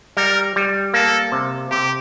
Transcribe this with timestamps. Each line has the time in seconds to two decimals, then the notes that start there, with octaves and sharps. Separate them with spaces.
0.17 G3 A#4
0.56 G3
0.94 A#3 A4
1.32 C3
1.71 C3 G4